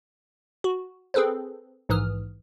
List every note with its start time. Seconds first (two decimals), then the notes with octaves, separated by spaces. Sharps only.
0.64 F#4
1.14 C4 G#4 A4 B4 C5
1.89 A#1 G#2 E3 D#6 F6